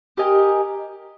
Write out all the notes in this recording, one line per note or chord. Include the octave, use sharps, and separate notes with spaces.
G4 A#4 D#5 G#5